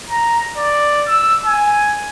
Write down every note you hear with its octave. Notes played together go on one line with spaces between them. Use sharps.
A#5
D5
E6
G#5